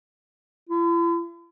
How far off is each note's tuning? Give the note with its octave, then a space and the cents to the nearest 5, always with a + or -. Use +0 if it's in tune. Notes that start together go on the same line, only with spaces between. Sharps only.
E4 +45